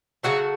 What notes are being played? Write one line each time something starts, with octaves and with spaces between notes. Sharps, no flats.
C#3 F#3 A3 F#4